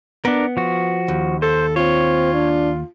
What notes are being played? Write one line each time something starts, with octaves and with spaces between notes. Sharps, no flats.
B3 D4 A#4
F3 F#4
D#2
A4 C5
C4 F4 C#5
D4